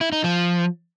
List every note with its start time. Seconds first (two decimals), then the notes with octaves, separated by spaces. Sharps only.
0.01 E4
0.12 D#4
0.24 F3